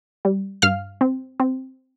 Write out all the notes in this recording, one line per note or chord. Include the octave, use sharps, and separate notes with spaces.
G3
G2 F5 F6
C4
C4